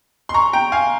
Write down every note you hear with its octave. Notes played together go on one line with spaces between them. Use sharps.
C6
A#5 C#6
G5 A#5
F5 G#5